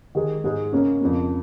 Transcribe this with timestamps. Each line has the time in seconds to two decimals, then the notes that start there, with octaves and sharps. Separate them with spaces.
0.15 D#3 G#3 D#4 G#4
0.44 G#2 G#3 D#4 G#4
0.72 C#3 A#3 C#4
1.01 F2 C#3 A#3